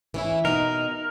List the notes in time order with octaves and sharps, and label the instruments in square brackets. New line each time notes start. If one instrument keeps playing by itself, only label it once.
[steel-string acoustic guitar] E3 C#4 E4
[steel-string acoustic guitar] B2 D#4 [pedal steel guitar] A#4